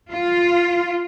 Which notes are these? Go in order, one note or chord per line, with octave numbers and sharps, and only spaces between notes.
F4